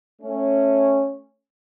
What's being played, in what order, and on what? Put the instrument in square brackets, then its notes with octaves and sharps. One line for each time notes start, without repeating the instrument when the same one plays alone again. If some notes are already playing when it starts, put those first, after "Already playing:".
[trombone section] A3 C#4